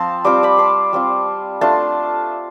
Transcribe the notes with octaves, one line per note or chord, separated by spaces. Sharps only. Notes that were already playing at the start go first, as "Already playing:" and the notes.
Already playing: F3 C4 A5 C6
G3 C4 F4 D6
B5 D6
A5 C6
G3 C4 F4
A3 D4 F4 A5 C6